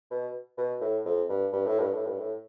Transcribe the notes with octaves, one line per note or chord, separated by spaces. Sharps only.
B2
B2
A2
F2
G2
G2
A2
G2
A2
G2
A2